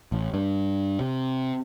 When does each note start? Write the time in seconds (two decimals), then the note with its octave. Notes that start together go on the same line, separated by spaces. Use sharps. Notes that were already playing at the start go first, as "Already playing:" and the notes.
0.12 A1
0.34 G2
1.00 C3